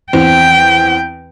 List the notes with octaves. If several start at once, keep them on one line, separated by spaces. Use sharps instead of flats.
E2 C4 G5